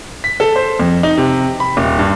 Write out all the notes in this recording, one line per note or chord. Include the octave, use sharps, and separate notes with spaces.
B6
A4
C5
F2
D#4
C3
B5
D#1
G2